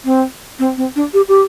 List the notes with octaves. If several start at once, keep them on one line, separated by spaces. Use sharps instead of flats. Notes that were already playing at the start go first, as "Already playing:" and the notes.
C4
C4
C4
D4
G4
G4